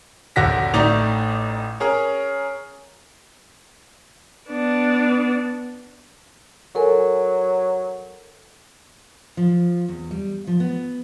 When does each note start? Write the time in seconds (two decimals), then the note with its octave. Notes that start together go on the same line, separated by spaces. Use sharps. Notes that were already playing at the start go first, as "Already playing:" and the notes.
0.36 D#1 A#1 D3 F#4 A#6 B6
0.74 A1 A3 D#4 D5 F7
1.80 C#4 G#4 A#4
4.50 B3 D4
6.75 F#3 A4 A#4 G#5
9.37 F3
9.88 E2
10.11 G3
10.47 F3
10.60 B3